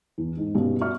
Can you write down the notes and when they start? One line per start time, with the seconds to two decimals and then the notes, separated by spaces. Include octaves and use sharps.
0.18 E2
0.37 G#2
0.54 G2 B2 C#4
0.81 F#4 D5 E5 C#6 F6